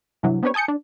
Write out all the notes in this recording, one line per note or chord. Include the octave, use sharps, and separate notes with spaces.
G2 C3 E3 F#3
B3 C4 D4 G4 B4 C#5
G#5 A5 D#6 G6 C#7
D4